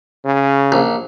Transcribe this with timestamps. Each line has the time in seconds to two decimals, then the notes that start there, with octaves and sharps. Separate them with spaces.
0.25 C#3
0.72 A#1